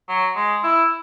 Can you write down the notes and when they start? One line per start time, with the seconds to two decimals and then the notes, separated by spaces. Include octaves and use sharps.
0.09 F#3
0.36 G#3
0.63 E4